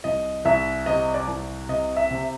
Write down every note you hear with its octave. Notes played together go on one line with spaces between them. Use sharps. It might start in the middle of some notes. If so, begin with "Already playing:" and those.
C2 D#5
C2 E5
C3 D#5
D5
C2
C3 D#5
E5
C3